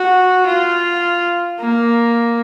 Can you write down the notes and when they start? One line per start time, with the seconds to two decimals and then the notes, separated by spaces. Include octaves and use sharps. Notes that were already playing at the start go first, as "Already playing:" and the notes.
Already playing: F#4
0.47 F4
1.60 A#3